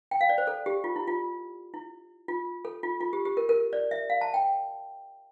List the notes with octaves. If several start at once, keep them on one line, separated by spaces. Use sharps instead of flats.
G5
F5
D5
C5
A4
G4
F4
E4
F4
E4
F4
A4
F4
F4
G4
G4
A#4
A#4
D5
E5
F5
A5
G5